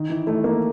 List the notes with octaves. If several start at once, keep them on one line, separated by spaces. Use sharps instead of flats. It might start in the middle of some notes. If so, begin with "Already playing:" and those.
Already playing: D#3
E3
A3
A#3